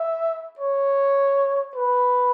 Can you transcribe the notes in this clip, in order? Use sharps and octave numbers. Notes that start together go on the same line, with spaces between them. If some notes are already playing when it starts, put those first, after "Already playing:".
Already playing: E5
C#5
B4